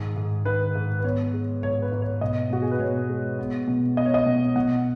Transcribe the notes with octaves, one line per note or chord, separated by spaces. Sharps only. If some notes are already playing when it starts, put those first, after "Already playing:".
Already playing: G#2 D#3 G#4
G#2
D#3 B4
G#2
B4
B3 C#5
G#3
G#2 C#5
B4
G#2
C#5
B2 D#5
B2 F#4
G#4
B4
B2 C#5
G#3
B3
B2
B3 D#5
C#5
D#5
B2
B2 F#5